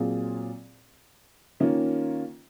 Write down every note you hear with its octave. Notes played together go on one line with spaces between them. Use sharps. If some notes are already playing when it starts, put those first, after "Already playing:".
Already playing: A#2 F#3 C4 F4 G#4
D#3 A#3 C#4 F4